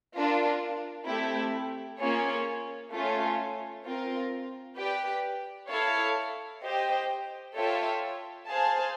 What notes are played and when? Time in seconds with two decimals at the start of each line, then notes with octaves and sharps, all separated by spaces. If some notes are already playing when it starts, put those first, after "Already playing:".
0.13 D4 F4 A#4
1.05 A3 C4 E4 G4
1.99 A#3 C#4 F4 G#4 C#5
2.91 A3 C#4 F4
3.84 C4 F4 A#4
4.77 G4 B4 D5 G5
5.70 E4 A4 C#5 F5
6.63 G4 C5 D#5 G5
7.56 F4 A4 C#5 E5 G5
8.48 G#4 C5 F5 A5